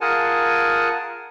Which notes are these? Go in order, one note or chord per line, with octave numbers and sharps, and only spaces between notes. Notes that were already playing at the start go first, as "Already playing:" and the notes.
F4 G#4 A#4 F#5 G#5 A5